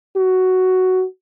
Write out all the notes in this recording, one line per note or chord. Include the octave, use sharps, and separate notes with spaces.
F#4